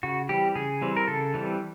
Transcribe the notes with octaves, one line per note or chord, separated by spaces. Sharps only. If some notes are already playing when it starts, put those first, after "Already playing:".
C#3 F#4
E3 G3 C4 G4
C#3 G#4
E3 G3 C4
A#4
C#3 A4
E3 G3 C4